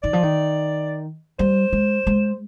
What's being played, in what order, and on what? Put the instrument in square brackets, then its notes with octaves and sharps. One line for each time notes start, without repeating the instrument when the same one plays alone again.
[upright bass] D#3 [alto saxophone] D5
[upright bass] F3
D#3
[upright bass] G3 [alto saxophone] C5
[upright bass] G#3
G#3